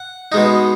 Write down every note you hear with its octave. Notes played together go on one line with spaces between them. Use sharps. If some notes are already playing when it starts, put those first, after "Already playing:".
Already playing: F#5
B2 G#3 D#4